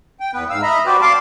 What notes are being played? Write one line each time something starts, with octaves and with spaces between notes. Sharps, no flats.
G5
E2 B3 B4
G#2 F5 E6
D#5 E5 A#5 B5
F#4 G4 B4 C5 D5
D5 F5 A5 C6 D6